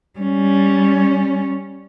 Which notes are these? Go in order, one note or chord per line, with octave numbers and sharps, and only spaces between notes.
G3 C#4